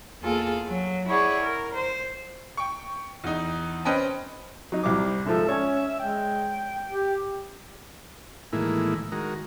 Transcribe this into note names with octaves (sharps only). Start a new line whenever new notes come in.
E2 A#3 F4 G#4 A4
F#3
E4 G#4 C#5 D5 F#5
A#4
C5
G5 C#6
E2 D#4
C4 C#4 B4 D#5 G5 A5
F#3 D#4
C2 G3 C5 D6
G#2 F3 A4 E5
C#4 C#5 D5
G#3 G5
G4
A2 D#3 E3 G#3 A#3 E4
D#3 G#3 F#4 A#4